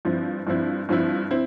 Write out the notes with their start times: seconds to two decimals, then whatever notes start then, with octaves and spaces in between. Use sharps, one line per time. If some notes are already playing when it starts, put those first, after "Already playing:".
0.05 G2 F3 C4 E4
0.47 G2 F3 C4 E4
0.89 G2 F3 C4 E4
1.31 C4 E4